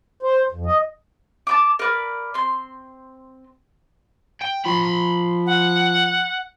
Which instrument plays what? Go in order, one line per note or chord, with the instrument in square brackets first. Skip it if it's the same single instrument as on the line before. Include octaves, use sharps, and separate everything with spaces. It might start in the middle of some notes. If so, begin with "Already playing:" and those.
[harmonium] C5
F2
D#5
[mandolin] A5 B5 D6
A#4 B4 D5
C4 C6
[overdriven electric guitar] G5
[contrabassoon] F3 [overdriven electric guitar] B5 C6
[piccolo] F#5